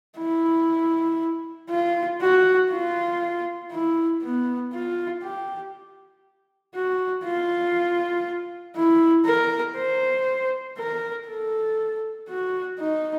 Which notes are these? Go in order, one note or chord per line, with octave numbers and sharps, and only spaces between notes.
E4
F4
F#4
F4
E4
B3
F4
G4
F#4
F4
E4
A#4
C5
A#4
A4
F#4
D#4